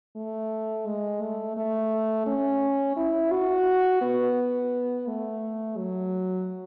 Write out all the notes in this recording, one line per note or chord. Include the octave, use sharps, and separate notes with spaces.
A3
G#3
A3
A3
C#4
E4
F#4
B3
A3
F#3